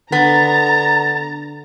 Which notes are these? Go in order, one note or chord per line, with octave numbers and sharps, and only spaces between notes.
D3 B3 A#5 A6